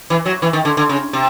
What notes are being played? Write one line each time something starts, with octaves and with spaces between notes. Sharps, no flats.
E3
F#3
E3
D#3
D3
D3
C#3
C3